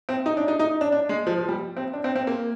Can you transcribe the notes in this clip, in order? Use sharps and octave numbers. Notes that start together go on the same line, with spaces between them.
C4
D#4
D4
D#4
D#4
D4
D4
G#3
F3
F3
G3
C4
D4
C4
C4
A#3